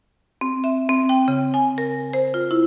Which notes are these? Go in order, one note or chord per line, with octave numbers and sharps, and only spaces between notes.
C4
E5
C4
G5
C#3
G#5
A#4
C5
F4
E4